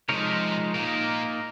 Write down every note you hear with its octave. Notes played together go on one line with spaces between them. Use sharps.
C3 F3 G#3 D#4 A#4 C#5
A#2 A#3 D#4 A#4